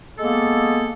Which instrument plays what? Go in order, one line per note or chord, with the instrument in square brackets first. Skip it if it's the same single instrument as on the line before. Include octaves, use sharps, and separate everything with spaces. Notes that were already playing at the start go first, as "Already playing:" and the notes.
[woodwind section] G#3 A#3 B3 A4